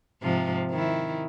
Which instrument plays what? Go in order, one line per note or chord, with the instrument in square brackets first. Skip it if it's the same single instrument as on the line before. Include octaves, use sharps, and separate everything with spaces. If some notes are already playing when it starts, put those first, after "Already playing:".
[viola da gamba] G#2 C3 F3
D#3 E4